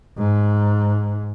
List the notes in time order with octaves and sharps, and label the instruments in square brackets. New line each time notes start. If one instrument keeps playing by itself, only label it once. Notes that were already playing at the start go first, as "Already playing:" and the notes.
[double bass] G#2